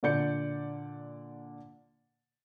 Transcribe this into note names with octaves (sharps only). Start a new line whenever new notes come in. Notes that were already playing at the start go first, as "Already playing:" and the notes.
A#2 D3 D5 G6 C#7